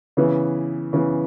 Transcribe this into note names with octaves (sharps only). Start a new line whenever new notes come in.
C#3 E3 B3
C#3 E3 B3